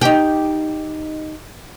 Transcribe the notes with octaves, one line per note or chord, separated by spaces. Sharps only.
D#4 G4